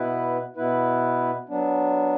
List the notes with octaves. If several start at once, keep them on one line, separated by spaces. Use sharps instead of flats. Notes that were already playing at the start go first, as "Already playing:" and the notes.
Already playing: B2 B3 E4 B4
B2 B3 E4 B4
F#3 B3 D4